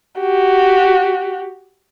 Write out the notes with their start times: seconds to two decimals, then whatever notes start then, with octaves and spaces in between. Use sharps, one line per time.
0.20 F#4 G4